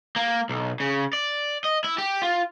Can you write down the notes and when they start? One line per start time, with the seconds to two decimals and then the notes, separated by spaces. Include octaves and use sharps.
0.16 A#3
0.49 B1
0.80 C#3
1.13 D5
1.64 D#5
1.84 E4
1.98 G4
2.22 F4